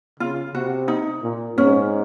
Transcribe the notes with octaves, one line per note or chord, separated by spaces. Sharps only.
C#3 F4
C3 F#4
D#4
A#2
G#2 C#4